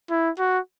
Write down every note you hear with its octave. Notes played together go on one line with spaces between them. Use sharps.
E4
F#4